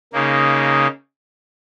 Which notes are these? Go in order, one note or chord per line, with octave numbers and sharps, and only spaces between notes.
C#3 A#3 D#4